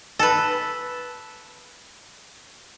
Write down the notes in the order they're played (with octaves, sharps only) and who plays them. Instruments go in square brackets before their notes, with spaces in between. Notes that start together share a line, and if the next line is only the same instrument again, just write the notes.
[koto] A4 B4